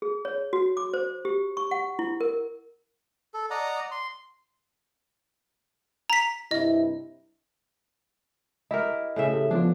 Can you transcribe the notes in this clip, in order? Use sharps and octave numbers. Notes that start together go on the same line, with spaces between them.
G#4
C#5
F#4
D6
C5
G4
C#6
F#5
E4
A#4
A4
D5 D#5 F#5 A#5
C6
A#5 B6
G2 C3 E4 D#5
E4 G4 A#4 D#5
A2 C#3 E5
G4 A4
F3 B3 D4 F4